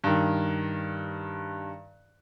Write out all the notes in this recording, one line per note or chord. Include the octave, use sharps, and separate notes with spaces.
G2 D#3